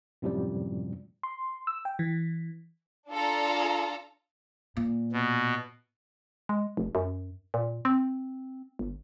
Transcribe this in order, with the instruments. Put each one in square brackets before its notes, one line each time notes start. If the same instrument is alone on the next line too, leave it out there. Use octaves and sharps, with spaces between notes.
[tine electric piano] F#2 A2 C3 F3 G3
[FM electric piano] C6
E6
G5
E3
[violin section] D4 F4 A4 A#5
[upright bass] A#2
[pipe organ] B2
[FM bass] G#3
F1
F#2
A#2
C4
G1